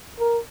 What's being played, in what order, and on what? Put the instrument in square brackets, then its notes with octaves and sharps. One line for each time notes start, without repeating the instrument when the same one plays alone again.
[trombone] A#4